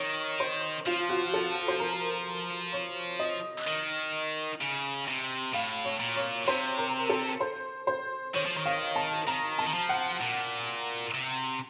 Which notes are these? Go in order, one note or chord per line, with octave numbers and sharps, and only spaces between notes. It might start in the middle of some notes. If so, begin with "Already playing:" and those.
Already playing: D#3 C#5
C5
F3 F4
F#4
A4
C5
A#4
C#5
D#5
D#3
C#3
C3
A2 F5
C#5
A#2
C#5
C3 C5
A#4
A4
C5
C5
D#3 C#5
F3
D#3
F5
A5
D#3 A#5
A5
D#3
F3
F#5
A#2
C3